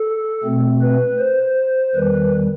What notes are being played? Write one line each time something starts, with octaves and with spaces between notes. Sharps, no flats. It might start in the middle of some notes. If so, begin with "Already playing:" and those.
Already playing: A4
B2 A3 C4
B4
C5
E2 D#3 G3 B4